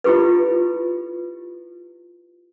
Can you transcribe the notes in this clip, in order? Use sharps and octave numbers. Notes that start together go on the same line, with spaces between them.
E4 F4 G4 A4 B4